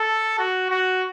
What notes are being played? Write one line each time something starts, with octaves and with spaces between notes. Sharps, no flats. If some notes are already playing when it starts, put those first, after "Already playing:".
Already playing: A4
F#4
F#4